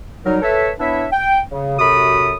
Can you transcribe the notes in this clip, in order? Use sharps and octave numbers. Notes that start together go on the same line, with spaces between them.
F#3 G3 D#4 A#4
A4 B4 C#5 E5
B3 D4 E4 C#5 E5
G5
C#3
F#2 C3 F#4 A4 B5 D#6